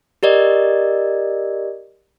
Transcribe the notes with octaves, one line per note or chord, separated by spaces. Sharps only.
G4 A#4 D5 D#5